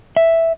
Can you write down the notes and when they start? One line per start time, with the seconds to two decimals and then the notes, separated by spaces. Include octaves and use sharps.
0.17 E5